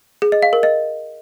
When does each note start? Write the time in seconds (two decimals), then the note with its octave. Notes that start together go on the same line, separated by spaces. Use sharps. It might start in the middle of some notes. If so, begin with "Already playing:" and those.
0.22 G#4
0.32 D#5
0.43 F5
0.53 A#4
0.63 D#5